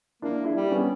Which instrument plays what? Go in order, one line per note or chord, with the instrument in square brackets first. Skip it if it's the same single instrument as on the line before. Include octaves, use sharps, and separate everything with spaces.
[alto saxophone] A#3 [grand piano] D4 E4
[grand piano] D4 E4
[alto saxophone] G3
[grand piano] B3 C#4